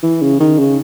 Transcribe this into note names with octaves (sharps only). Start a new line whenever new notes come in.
E3
C#3
D#3
C#3